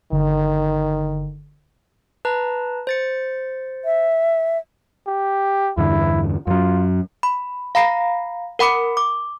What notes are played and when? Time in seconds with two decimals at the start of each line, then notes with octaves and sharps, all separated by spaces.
0.12 G1 D3 D#3
2.25 B4 A5 A#5
2.87 C5 A6 C#7
3.85 E5
5.07 G4
5.77 E2 G2 D3 E4
6.47 F#2 F#3 F4
7.23 B5
7.75 F5 A#5 B5 A#6 C7
8.59 A#4 F#5 B5 D6 C#7
8.97 D6